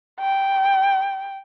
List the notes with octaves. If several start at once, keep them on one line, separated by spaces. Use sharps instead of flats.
G5